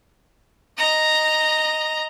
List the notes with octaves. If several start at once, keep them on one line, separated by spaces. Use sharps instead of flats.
D#5 A#5